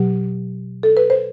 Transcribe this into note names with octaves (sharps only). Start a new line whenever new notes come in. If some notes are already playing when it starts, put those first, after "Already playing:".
Already playing: B2 F#3 G4
A4
B4
C5